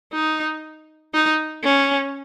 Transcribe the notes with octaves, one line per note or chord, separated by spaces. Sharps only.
D#4
D#4
C#4